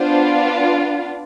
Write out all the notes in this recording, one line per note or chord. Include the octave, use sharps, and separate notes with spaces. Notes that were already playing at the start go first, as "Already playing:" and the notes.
Already playing: B3 D4 F4 C5